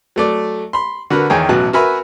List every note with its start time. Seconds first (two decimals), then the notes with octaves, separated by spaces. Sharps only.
0.16 F#3 A3 D5
0.73 B5 C6
1.10 D3 F#4 A#4 B4
1.30 E2 D#3 G#4 C#5 G5 A#5
1.49 A1 B2 F#3 A5 F#6
1.73 F#4 A#4 B4 E5 G#5 B5